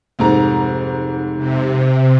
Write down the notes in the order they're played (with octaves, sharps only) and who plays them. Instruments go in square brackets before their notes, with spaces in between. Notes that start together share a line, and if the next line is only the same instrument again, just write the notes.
[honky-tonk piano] F1 G#2 A#5
[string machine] C3